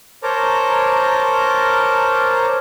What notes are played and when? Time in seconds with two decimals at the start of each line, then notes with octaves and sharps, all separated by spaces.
0.23 A#4 C5 C#5 A5 A#5 D6